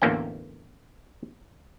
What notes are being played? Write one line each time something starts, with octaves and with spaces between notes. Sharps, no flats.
A1 E2 D3 A#3 C#4 G5